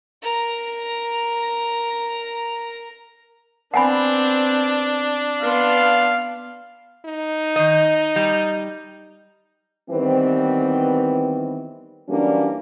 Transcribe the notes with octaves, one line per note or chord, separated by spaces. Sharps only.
A#4 A#5
B3 C4 D4 F#5 G#5 B5
B3 F5 C6
D#4
D#3 D#5
G3
D#3 E3 G3 B3 C4
E3 F#3 G3 A#3 C#4 D4